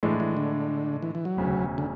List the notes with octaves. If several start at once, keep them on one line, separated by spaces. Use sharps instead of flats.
A2 E3 G#3 D4
E3
D3
E3
E3
F#3
E1 D2 C#3
D3